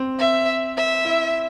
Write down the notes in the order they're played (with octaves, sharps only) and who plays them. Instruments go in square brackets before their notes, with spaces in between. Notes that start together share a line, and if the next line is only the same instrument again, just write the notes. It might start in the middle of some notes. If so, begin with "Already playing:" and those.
Already playing: [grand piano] C4
[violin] E5
E5
[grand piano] E4